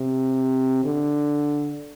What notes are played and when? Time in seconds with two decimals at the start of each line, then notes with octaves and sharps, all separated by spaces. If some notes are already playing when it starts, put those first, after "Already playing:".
Already playing: C3
0.85 D3